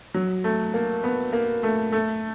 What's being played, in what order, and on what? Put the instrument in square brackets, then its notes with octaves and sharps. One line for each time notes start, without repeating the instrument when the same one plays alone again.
[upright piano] F#3
A3
A#3
B3
A#3
A3
A3